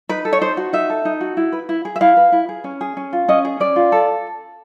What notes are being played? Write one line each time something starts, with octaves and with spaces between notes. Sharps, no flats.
D#4 B4
A4
C#5
D#4 C5
F#4
D#4 E5
A4
D#4
F#4
E4
B4
E4
G#4
E5
E4 F5
B4
E4
G#4
C#4
G#4
C#4
F4
C#4 D#5
G#4
C#4 D5
F4
A4